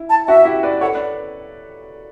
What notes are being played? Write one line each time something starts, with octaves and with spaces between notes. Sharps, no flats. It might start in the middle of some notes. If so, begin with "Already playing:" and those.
Already playing: E4
A5
F#4 E5
E4 G4
B4 D5
A4 C#5 F#5
B4 D5